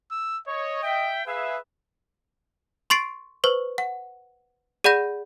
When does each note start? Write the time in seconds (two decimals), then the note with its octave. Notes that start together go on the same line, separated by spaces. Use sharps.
0.11 E6
0.48 C#5 D#5
0.83 E5 G5
1.27 G#4 B4 E5 F5
2.90 C6 C#6 A6 C7 D7
3.44 B4 C5 C#6
3.78 F#5
4.84 G#4 D5 F#5 B5 G6 A#6